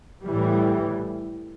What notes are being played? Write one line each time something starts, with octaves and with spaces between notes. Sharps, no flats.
A2 E3 G3